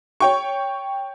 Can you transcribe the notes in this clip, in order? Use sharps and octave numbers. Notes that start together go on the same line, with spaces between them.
C#5 G5 C#6